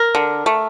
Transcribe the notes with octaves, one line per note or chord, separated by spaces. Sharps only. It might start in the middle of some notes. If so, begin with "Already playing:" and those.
Already playing: A#4
D3
A3